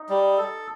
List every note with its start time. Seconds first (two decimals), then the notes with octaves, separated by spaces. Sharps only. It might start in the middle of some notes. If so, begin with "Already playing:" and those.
Already playing: D#4
0.10 G3
0.38 A4